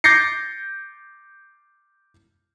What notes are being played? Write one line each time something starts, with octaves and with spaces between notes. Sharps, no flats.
D6 G6 A6 A#6 C7 C#7